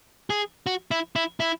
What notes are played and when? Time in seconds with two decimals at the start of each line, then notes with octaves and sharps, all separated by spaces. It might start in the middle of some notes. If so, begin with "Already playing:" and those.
0.30 G#4
0.66 F#4
0.91 E4
1.16 E4
1.40 E4